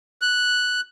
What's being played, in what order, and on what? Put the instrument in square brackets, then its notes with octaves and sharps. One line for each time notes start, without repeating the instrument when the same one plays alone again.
[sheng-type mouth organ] F#6